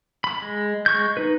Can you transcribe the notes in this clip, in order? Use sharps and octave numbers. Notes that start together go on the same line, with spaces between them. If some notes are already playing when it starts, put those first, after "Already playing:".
B5
G#3
G#3 C#6 G6
D#4 B4